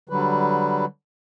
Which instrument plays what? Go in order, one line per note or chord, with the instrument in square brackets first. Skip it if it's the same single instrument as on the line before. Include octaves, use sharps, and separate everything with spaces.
[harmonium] D3 F#3 G3 B4